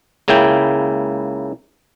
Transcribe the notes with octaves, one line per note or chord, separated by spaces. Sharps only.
C#2 C#3 A#3 E4 G5